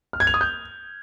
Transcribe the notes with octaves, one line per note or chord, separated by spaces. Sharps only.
F6
G#6
F7
D#6
G6